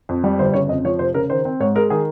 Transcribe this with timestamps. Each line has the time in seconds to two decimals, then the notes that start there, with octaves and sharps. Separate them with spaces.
0.09 F2
0.24 G3
0.39 G1 C5
0.54 C#3 C#5
0.69 F2 D#5
0.85 F3 C#5
0.99 F1 C5
1.14 C#3 A#4
1.30 D#3 C5
1.45 C4
1.60 G#2 C#5
1.75 G#3 A#4
1.90 D#3 G#4